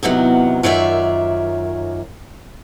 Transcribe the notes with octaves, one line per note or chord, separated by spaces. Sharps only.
E2 C3 D#3 F#3 B3
F#2 D#3 F4 C#5 D5 E5